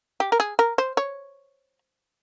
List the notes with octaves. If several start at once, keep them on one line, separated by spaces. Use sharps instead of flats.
G4
A#4
G#4
A#4
C5
C#5